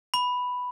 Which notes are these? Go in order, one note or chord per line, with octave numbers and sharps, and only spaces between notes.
B5